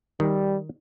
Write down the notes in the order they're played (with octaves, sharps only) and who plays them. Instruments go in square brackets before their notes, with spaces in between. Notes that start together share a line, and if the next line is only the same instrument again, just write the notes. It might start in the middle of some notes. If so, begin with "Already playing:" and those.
[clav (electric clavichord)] D#3 [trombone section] G3